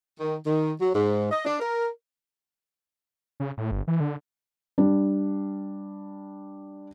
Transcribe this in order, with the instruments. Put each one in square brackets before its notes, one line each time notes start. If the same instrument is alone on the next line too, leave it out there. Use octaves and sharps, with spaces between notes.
[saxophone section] D#3
D#3
F#3
G#2
D#5
D4
A#4
[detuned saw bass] C#3
A2
G1
E3
D3
[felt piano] G3 D4